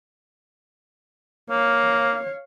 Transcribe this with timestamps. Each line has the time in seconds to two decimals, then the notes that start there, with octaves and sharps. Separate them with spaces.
1.50 A#3 C#5 F5